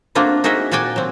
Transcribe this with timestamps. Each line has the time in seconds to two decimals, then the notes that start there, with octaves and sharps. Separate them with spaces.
0.15 A3 A#3 C4 D4 F4 F#4
0.44 D#4 F#4 G#4 A#4 D#5 E5
0.72 A#2 F#4 D5 G5 G#5
0.96 F#3 C4